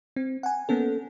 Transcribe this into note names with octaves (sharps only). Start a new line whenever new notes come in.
C4
F#5 G#5
A#3 B3 C#4 A4